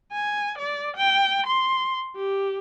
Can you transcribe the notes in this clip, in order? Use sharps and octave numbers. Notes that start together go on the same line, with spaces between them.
G#5
D5
G5
C6
G4